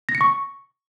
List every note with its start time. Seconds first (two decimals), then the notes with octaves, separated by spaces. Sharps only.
0.09 A#6
0.15 C#7
0.21 C#6